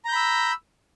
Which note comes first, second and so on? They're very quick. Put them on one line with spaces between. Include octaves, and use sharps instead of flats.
A#5 G6 B5 E6